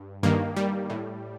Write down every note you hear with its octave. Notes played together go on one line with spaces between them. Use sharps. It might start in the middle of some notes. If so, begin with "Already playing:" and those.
Already playing: G2
G2 D#3 A#3
G3
A2